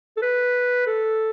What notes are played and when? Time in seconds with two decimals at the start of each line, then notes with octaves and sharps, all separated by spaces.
0.17 A4
0.22 B4
0.87 A4